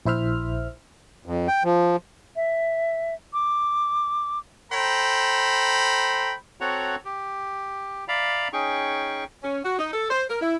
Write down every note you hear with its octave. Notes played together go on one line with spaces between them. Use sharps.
A#1 E4 C5 E5 F6
F2
G5
F3
E5
D6
A4 C5 G5 A#5 B5
C4 F#4 A4 C#5 F#5 A#5
G4
D5 E5 F5 A#5 B5
C#4 D#4 G#4 G5 C#6
C#4
F#4
D#4
A4
C5
A#4
E4